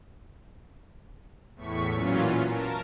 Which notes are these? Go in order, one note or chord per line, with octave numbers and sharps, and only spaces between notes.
E2 A2 C#6 B6
A#2 E3 F#3 C#4 F4
A#4 A5